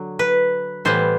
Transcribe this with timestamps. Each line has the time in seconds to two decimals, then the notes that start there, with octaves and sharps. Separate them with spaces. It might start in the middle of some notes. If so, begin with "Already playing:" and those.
Already playing: D3 F#3
0.19 B4
0.85 A2 E3 G3 B3 C5